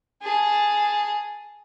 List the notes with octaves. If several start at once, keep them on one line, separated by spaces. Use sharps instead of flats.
G#4 A5